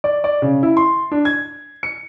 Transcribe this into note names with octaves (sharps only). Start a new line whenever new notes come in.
D5
D5
C#3
E4
C6
D4
G#6
C#7